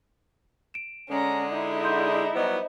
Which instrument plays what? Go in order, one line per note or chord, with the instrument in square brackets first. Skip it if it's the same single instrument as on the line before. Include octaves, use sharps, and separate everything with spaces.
[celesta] D7 E7
[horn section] D3 G#3 [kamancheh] C#4 A#5
[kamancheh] D#4 E4
[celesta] C6 G6
[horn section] F#3 G3 B3 [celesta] C5 D#5